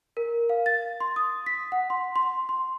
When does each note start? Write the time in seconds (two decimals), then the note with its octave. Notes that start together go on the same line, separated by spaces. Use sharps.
0.17 A#4
0.49 F5
0.66 A6
1.00 C6
1.16 D#6
1.46 B6
1.72 F#5
1.90 C6
2.16 C6
2.49 C6